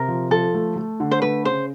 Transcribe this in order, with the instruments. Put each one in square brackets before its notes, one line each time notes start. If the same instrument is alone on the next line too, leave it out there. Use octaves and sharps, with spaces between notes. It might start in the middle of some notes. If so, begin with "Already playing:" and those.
Already playing: [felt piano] C3 [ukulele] A#4
[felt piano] F3
[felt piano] F3 [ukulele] A4
[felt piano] A3
A3
D3
[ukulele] C5
[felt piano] A3 [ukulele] B4
[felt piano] C#3 [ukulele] C5